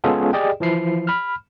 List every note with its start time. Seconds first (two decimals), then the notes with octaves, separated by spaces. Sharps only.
0.04 G#3 B3 C#4 F4 G#4 A4
0.33 G4 G#4 D5 D#5 G5
0.60 E3 F3 E4 C7
1.07 B5 F6